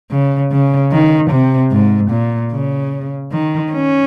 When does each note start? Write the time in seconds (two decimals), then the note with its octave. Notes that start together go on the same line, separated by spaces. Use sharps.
0.11 C#3
0.52 C#3
0.92 D#3
1.31 C3
1.72 G#2
2.11 A#2
2.51 C#3
3.32 D#3
3.72 C#4